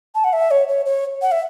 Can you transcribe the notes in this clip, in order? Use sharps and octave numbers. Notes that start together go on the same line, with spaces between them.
A5
F#5
E5
C#5
C#5
C#5
F#5
E5